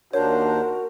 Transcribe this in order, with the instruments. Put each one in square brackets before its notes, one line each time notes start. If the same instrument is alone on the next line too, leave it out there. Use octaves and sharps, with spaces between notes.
[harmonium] D#2 D4 C5 [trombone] F#4 [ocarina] A#4 [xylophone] C#5